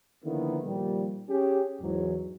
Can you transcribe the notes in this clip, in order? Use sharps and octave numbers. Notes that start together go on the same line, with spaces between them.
D3 D#3 F3 A#3 B3 E4
A#2 D#3 F3 G3
C#4 G4 G#4
E2 G#2 F#3